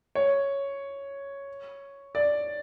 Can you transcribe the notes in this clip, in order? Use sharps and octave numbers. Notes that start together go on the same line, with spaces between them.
C#5
D5